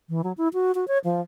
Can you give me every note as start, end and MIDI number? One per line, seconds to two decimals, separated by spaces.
0.09 0.22 52
0.24 0.33 54
0.38 0.48 64
0.54 0.72 66
0.75 0.87 66
0.88 0.98 73
1.05 1.21 53